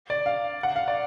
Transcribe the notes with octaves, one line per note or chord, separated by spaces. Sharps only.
D5
F5
F#5
F5
D5